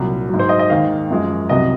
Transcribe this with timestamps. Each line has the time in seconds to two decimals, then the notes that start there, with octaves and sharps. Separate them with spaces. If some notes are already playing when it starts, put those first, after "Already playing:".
Already playing: C2 A#2 F#3
0.29 G#2 F#3
0.39 C5
0.49 D#5
0.59 D#5
0.70 D#2 D#3 G#3 F5
1.10 F#2 F3 G#3
1.49 C2 C3 F#3 D#5